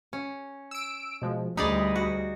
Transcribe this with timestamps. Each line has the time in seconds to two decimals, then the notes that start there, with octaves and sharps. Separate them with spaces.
0.13 C#4
0.71 E6 D7
1.22 B2 F3 G#3
1.57 D2 G3 D#4 G#4 D5 B5 D#6
1.96 F#4